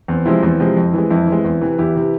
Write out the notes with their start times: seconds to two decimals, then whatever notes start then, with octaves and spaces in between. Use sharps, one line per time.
0.08 E2 C4
0.26 C3 F3 G#3 C4 E4
0.43 E2 C4 E4
0.60 C3 F3 G#3
0.77 F2
0.94 E3 G#3
1.10 F2 C4 E4
1.28 E3 G#3
1.45 E2
1.61 C3 E3
1.78 E2 E4 G4
1.96 C3 E3